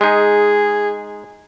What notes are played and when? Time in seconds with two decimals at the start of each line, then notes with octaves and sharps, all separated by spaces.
0.01 G#3 D#4 G#4